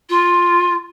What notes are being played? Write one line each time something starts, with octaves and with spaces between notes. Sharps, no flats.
F4